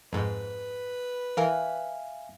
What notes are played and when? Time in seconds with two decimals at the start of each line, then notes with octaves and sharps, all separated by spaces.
0.13 F2 G#2 B4
1.37 E3 A#4 E5 F5 G#5